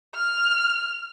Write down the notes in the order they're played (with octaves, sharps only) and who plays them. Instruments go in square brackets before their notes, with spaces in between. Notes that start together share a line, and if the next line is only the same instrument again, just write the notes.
[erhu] F6